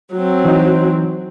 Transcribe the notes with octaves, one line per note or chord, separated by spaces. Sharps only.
F#3 C4
E3 D#4